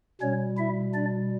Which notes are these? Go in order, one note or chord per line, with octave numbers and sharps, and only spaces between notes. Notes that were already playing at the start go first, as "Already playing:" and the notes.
B2 G3 C#4 C#5
E4 E5
D4 D5